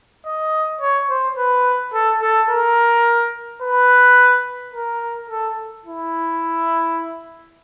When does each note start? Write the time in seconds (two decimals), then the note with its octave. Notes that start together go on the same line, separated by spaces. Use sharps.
0.26 D#5
0.81 C#5
1.10 C5
1.38 B4
1.94 A4
2.22 A4
2.49 A#4
3.62 B4
4.74 A#4
5.30 A4
5.86 E4